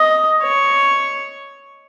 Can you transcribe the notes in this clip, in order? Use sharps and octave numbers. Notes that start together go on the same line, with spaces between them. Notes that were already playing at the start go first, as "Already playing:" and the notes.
Already playing: D#5
C#5